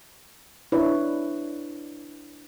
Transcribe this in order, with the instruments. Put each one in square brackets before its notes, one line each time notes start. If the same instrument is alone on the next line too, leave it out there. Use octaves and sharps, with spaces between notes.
[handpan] D4 E4 B4 C#5